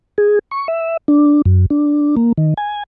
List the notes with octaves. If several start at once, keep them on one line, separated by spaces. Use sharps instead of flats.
G#4
C#6
E5
D4
F#2
D4
A#3
D#3
G#5